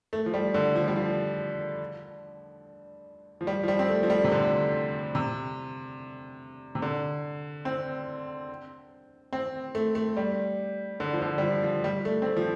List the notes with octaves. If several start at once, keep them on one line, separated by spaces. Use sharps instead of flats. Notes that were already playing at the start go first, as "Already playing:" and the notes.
A3
F3
G3
D3
F3
G3
F3
F3
G3
F3
G3
C4
A3
F3
G3
C3
D3
C3
C3
D3
C4
C4
A3
A3
G3
D3
F3
D3
G3
F3
F3
G3
A3
C4
A3
F3